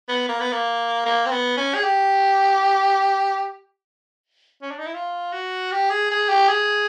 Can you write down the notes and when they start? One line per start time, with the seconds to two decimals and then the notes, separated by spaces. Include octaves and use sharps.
0.09 B3
0.28 A#3
0.40 B3
0.52 A#3
1.06 A#3
1.26 C4
1.31 B3
1.57 C#4
1.75 G#4
1.83 G4
4.62 C#4
4.71 D4
4.79 D#4
4.86 E4
4.94 F4
5.33 F#4
5.72 G4
5.90 G#4
6.11 G#4
6.29 G4
6.49 G#4